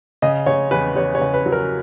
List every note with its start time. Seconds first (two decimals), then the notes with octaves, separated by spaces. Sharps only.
0.22 C#3 D#5
0.46 C#3 C#5
0.71 E2 B4
0.96 E2 C#5
1.15 C#5
1.21 C#3
1.34 B4
1.46 F#3
1.52 A#4